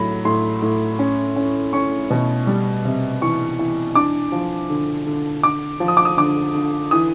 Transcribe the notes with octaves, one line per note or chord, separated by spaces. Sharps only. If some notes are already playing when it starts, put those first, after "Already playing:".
Already playing: A2 F#3 B5
A2 C6
A2
C#4
C#4
C#4 C#6
B2
G3
C3
E3 C#6
E3
D4 D6
F3
D3
D3
D3 D6
F3
D#6
D6
D#6
D3 D6
D3
E3 D#6